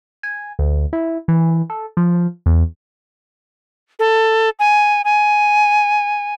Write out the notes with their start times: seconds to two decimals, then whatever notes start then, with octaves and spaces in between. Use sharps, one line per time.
0.23 G#5
0.59 D2
0.93 E4
1.28 E3
1.70 A4
1.97 F3
2.46 E2
3.99 A4
4.59 G#5
5.05 G#5